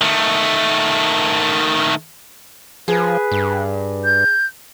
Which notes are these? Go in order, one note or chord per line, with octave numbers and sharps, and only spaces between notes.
D#3 A3
F3 G#4 B4
G2
G6